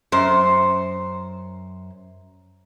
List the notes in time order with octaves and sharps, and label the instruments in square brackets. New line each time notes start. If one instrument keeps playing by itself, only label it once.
[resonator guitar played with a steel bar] F#2 C5